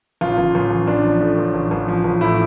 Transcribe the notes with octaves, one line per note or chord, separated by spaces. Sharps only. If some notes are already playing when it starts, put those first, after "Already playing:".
A1 F4
A1
A1
A1
A1 D4
F3
A2
A1
A1
A1
F3
A1
A2 E4